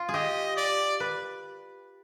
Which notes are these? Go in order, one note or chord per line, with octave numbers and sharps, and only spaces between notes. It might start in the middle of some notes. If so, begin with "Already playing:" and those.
Already playing: F4
G#4
G4 D#5
D5
B4